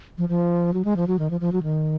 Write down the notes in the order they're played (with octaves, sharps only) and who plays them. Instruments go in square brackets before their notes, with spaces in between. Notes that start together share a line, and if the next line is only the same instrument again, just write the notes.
[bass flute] F3
F3
F#3
G#3
F3
F#3
D#3
F3
F3
F#3
D#3